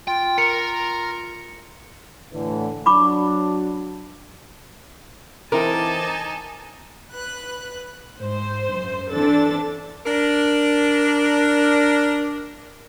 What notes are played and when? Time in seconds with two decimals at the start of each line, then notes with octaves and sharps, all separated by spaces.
0.08 F4 G5
0.38 A#4 C#7
2.33 A2 D3 E3
2.86 F#3 D4 B5 C#6 D6
5.52 E3 C4 D#4 A#4 G#5 A5 D6
7.11 B4 F#6
8.21 G#2 C5
8.75 F#2
9.12 E3 C4 D4 A4 A6
10.06 D4 A#4